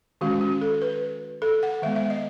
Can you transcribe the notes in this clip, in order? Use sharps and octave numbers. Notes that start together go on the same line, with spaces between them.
D#3 G#3 C#4 F#4
F#4
A4
B4
A4
F#5
D#3 G#3 B3 E5
E5
D#5